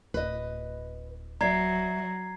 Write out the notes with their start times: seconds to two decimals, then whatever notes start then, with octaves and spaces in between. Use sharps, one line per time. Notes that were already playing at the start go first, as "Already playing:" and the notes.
0.14 D1 B4 D#5
1.41 F#3 D5 E5 A#5 G#6 C7